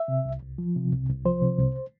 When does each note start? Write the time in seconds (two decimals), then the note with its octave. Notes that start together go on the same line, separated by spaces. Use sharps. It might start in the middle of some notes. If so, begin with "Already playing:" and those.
Already playing: E5
0.08 C3
0.25 C2
0.42 C2
0.58 F3
0.76 C3
0.92 C2
1.09 C2
1.25 F3 C5
1.42 C3
1.58 C2